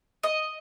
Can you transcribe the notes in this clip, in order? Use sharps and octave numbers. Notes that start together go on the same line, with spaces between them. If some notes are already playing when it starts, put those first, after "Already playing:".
D#5